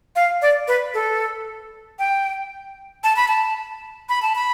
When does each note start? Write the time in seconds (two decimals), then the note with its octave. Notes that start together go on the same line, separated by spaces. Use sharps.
0.16 F5
0.42 D5
0.68 B4
0.94 A4
1.99 G5
3.04 A5
3.16 B5
3.28 A5
4.09 B5
4.22 A5
4.35 B5